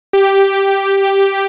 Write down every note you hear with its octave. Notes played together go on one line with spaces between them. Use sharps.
G4